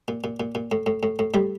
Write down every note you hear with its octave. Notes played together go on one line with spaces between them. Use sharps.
A#2
A#2
A#2
A#2
A2
A2
A2
A2
A2 G3